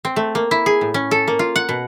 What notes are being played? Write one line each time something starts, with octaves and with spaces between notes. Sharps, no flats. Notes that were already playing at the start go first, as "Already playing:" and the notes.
C4
A3
A#3
E4
G#4
A2
C#4
A4
A#3
F4
F#5
B2